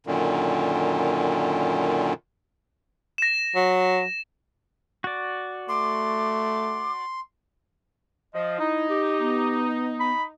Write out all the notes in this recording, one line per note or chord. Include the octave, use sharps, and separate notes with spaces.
F#2 A#2 D3 D#3
A#6 E7
F#3
F#4 D5
A3 C6 D6
F3 D#5
D#4 E4
G4
B3
B5